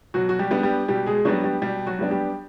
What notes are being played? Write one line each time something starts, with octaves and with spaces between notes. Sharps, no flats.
B2 F#3 F#4
F#4
G3 G4
G3 B3 D4
G3 G4
B2 G3 G4
G#3 G#4
F#3 G3 B3 D4 F#4
G3 G4
B2 G3 G4
F#3 F#4
G3 B3 D4
G3 G4